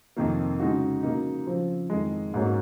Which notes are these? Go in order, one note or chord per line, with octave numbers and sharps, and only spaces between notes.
F2 C3 D#3 A#3
C#3 G#3 D#4 F#4
C#3 F#3 A#3 D#4
C#3 F3 C4 F4
F2 D#3 G#3
G#2 F#3 A#3 C#4